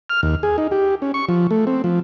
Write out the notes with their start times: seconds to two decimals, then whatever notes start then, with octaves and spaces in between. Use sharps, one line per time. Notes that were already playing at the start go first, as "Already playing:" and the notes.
0.10 F6
0.23 D#2
0.43 G#4
0.58 D#4
0.71 G4
1.02 C#4
1.14 C#6
1.29 F3
1.51 A3
1.67 C4
1.84 F3